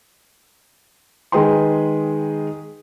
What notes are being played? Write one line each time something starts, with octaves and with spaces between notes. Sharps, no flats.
D#3 G#3 G#4 B4 G5 C6